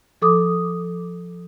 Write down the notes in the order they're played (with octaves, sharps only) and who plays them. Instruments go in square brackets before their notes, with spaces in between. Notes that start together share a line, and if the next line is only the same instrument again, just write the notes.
[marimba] F3 A4 D6 D#6